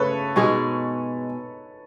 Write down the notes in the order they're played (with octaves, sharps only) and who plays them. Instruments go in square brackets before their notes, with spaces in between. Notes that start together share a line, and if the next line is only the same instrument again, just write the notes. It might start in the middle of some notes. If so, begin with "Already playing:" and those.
Already playing: [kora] C#3 A3 [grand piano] A4 B4 C#5
[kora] B2 G#3 D#4 G#4